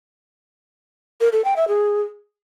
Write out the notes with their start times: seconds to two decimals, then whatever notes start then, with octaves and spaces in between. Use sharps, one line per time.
1.21 A#4
1.33 A4
1.45 G5
1.56 E5
1.68 G#4